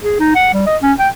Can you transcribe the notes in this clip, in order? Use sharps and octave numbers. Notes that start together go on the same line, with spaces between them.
G#4
D#4
F#5
G3
D#5
C#4
G5